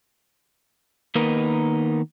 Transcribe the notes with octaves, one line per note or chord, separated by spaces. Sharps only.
D#3 A#3 B3 D#4 A#4 B4